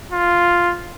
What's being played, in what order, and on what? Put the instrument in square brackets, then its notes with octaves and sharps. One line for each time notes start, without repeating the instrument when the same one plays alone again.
[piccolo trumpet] F4